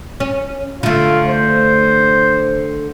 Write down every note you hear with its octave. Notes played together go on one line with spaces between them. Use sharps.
C#4
D3 A3 F4
C5